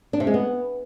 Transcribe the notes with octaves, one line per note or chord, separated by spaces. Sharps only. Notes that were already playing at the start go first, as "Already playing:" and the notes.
D4
C3
G#3
B3